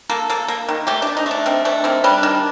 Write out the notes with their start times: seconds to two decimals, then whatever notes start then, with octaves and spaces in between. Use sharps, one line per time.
0.09 A#3 A4
0.30 A#3 A4
0.48 A#3
0.69 D#3
0.87 A3 G4
1.02 A3 D4
1.17 D#4
1.26 A3 D4
1.46 D#3 C4
1.65 A3 D4
1.84 D#3 C4
2.04 G3 D4
2.23 D#3